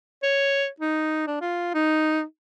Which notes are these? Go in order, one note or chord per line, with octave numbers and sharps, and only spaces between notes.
C#5
D#4
D4
F4
D#4